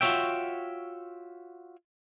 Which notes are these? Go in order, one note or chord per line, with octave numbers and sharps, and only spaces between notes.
F4 F#4 G#4 C#5 E5 G5